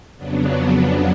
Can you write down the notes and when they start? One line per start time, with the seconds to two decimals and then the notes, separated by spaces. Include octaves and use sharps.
0.17 F2 C#3 F#3 B3 D4